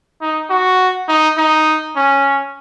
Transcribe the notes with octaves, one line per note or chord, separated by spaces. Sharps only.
D#4
F#4
D#4
D#4
C#4